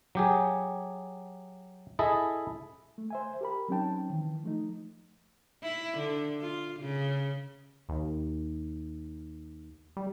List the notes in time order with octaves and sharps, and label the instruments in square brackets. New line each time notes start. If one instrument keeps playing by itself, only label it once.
[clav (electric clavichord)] F#3 G4 G#4
E4 G#4 A4 D#5 E5
[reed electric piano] A3
C5 E5 G#5
G4 A#4 B5
F#3 C4 C#4 D#4 G5 A5
D#3 E3
F3 A3 D#4
[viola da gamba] E4
D3
F4
C#3
[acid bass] D#2
G3